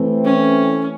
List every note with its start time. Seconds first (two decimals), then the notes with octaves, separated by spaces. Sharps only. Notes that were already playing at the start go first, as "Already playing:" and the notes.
Already playing: E3 A3 C4
0.25 C#4